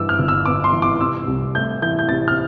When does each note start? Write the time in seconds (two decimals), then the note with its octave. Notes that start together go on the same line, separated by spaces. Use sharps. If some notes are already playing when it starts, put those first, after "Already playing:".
Already playing: G2 E3 D6 E6
0.09 F6
0.19 G1
0.28 E6
0.45 B3 D6
0.64 C6
0.72 E3
0.82 D6
1.00 C3 E6
1.28 C2
1.55 A3 G6
1.82 E3 G6
1.99 G6
2.09 C3 A6
2.28 F6